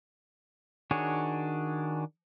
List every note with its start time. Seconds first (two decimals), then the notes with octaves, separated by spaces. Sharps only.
0.91 D#3 D4 F#4 G#4 C#5